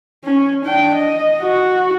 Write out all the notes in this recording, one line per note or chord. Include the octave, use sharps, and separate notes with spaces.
C#4
D4 G5
D#5
F#4